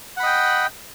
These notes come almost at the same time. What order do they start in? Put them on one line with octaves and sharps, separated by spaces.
F#5 B5 D#5 G5